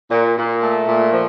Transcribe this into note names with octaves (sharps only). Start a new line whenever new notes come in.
A#2
A#2
A3
A#2
F3